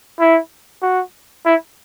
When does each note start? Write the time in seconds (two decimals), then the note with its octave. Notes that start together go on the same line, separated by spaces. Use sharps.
0.20 E4
0.82 F#4
1.46 E4